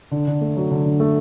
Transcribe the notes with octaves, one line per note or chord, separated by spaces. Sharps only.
D3
D3
A3
F#3
D3
D3
A3